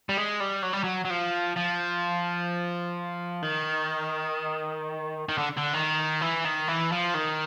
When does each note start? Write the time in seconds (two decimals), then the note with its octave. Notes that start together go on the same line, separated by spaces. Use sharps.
0.09 G3
0.17 G#3
0.40 G3
0.63 F#3
0.73 G3
0.84 F#3
1.05 F#3
1.10 F3
1.56 F3
3.42 D#3
5.29 D#3
5.38 D3
5.57 D3
5.74 D#3
6.21 E3
6.45 D#3
6.68 E3
6.92 F3
7.14 D#3